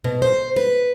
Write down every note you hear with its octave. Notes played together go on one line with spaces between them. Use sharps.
B2
C5
B4